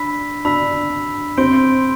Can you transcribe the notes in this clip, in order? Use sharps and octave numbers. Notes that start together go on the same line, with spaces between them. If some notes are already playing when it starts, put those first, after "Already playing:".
Already playing: D4 B5 E6 B6
D4 B5 E6 B6
C4 C6 G6 D7 G7